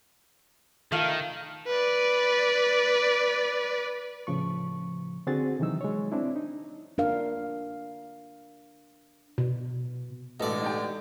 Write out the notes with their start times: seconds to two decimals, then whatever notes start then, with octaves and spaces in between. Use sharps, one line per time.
0.92 D#3 A3 F4 F5
1.68 B4 D5
4.27 A2 C#3 F3 C#6
5.27 D3 C4 F#4 G#4 A6
5.59 C3 D#3 E3 F#3 D#4 E6
5.81 G#3 C#5
6.12 C4 D4 E4
6.36 D#4
6.98 D4 A#4 F5
9.38 B2
10.40 A1 B2 D3 G#3 A4 D5 D#5
10.62 D#4 G4 G5